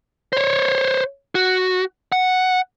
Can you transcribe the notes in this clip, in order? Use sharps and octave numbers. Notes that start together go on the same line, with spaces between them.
C5 C#5
F#4
F#5